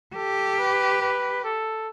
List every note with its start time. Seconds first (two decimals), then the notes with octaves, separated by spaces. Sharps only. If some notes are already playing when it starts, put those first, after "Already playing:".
0.15 G4 A4
0.58 B4
1.01 B4
1.44 A4